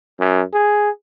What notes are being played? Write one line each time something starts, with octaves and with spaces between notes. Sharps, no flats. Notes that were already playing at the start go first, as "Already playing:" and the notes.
F#2
G#4